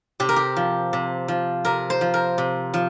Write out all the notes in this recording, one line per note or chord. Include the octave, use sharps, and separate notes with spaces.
C3 G4
A#4
G4
F3
C3
F3
C3 A#4
C5
F3
A#4
C3
F3